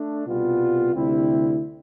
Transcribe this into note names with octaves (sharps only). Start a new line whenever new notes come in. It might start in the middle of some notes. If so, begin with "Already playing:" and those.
Already playing: A3 D4
C2 B2 G3 B3 F4
D2 C3 G3 C4 E4